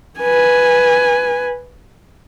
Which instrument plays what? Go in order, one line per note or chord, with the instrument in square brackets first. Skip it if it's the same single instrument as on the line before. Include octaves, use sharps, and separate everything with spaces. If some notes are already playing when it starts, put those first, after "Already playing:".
[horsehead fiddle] B4 G#5